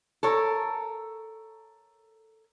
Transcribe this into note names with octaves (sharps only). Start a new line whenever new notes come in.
A4 A#4 C#5